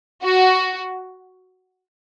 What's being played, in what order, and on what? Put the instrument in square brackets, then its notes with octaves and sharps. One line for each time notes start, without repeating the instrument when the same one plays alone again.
[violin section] F#4